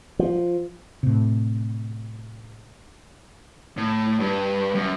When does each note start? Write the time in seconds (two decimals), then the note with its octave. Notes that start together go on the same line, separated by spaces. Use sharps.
0.19 F3
1.03 A2 C3
3.77 A2
4.20 G2
4.75 F#2